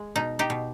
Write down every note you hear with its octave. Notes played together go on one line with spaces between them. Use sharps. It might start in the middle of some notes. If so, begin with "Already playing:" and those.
Already playing: G#3
B2 D#4
D#4 G4
B2